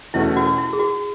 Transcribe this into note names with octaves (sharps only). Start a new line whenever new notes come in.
E2 B2 A3 C#4 E4
F#4
F#4
E4
G#4
F#4